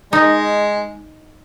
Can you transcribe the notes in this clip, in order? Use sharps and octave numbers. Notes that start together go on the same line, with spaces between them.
G#3 D#4